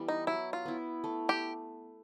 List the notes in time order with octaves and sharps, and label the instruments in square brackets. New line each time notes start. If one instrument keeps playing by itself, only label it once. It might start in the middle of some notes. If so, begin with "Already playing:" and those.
Already playing: [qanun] E3 G3 B3
[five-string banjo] D#4
[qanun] F#3 [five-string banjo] E4
[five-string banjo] F4
[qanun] B3 E4
A3
[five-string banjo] G4